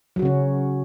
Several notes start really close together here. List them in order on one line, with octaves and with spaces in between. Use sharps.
F#3 F#4 C#3 C#4